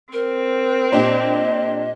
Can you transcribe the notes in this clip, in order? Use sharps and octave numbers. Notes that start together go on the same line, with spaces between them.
C4 A#4
A#2 D4 G4 D#5